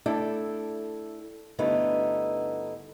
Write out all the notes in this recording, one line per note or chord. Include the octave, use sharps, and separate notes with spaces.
A3 D4 E4 A4 G5
G2 D3 A3 B3 D#4 E4